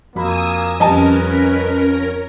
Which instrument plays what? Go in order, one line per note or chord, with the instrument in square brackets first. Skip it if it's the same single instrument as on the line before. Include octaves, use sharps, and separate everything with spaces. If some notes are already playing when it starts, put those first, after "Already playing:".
[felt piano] F2 F#4 B5 [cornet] A#3 [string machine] G#5 D#6 E6
[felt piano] F2 G3 [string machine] C#4 A#4 [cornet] B4 [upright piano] D#5 G#5 A5